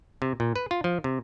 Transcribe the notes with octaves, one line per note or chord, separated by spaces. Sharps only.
C3
A#2
B4
F4
F3
C3